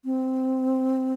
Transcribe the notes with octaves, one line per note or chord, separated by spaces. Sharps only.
C4